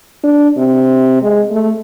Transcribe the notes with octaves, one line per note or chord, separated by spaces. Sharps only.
D4
C3
G#3
A3